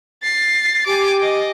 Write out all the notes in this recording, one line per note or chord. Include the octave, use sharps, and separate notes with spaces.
A6 C7
G4 G#5 D6
D#5